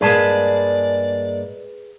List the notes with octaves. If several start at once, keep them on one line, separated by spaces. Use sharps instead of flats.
G2 G#3 A#3 G#4 B4 D5 A5